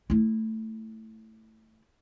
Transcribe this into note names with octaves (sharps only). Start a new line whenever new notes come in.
A3 E4